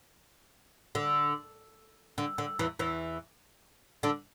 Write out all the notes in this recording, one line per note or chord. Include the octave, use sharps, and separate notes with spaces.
D3
D3
D3
E2 E3
E2 E3
D3 D4